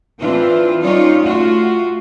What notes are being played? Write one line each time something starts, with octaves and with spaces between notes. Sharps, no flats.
E3 C4 D4 F4
G3 C#4 D#4 F4 C#5 D5
A3 F4 F#4